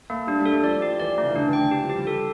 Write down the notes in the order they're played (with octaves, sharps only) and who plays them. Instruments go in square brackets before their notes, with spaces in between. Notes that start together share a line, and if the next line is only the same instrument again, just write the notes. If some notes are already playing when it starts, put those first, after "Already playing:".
[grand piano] A3 [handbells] A#3
[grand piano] G3 [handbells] D4
[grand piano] G3
[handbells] A4
[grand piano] A3
[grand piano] F3 [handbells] D5
[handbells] G4
[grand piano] E3 [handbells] D5
[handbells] A3
[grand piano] C#3
E3
[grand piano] D3 [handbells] D4
[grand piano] E3
[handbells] G5
[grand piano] E3
[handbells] G4
[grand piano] F3
[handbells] G4
[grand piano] G3
[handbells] A4